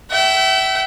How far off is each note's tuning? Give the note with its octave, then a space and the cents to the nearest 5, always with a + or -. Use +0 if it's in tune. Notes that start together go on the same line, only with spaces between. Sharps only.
E5 +0 G5 -45